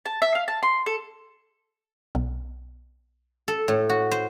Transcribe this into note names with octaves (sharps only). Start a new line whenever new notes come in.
A5
E5
F5
A5
C6
A4
B1
A4
A2
F#4
C5